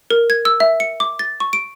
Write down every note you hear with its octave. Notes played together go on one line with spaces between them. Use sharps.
A#4
G#6
E6
E5
C#7
D6
A6
C#6
D7